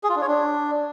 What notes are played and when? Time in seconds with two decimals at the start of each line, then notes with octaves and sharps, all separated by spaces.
0.03 G#4
0.10 F4
0.16 D4
0.22 C#5
0.28 D4